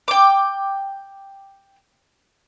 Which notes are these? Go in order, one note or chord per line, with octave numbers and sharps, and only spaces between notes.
G5 D6